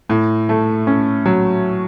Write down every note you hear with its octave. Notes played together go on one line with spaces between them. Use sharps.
A2
A3
C#4
F#3